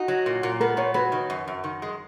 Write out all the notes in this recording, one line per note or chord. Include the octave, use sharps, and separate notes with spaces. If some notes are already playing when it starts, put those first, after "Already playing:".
Already playing: D#4 F#4
F#3
A#2
A#2
B3 A#4
A#2 C#5
F#3 B4
D#3
F#2
F#2
D#3
G#3